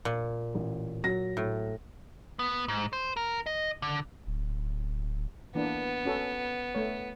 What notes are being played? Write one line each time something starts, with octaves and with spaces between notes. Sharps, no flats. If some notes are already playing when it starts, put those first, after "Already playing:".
A#2
A1
F#3 A#6
A2
B3
G#2
C5
A#4
D#5
D3
D1
E3 A#3 B3 D4
C#4 F#4 A4
A3 C#5